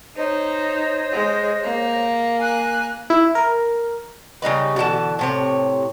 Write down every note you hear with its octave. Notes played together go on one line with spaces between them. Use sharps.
D#4 C5 C#5 D#5
G#3
A#3
G#5 F#6
E4
A#4
C#3 G3 D#4 B4
B2 D3 E3 A5
A2 C3 C#5